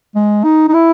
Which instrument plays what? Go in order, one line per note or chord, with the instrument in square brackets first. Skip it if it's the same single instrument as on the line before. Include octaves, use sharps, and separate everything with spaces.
[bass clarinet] G#3
D#4
D#4
E4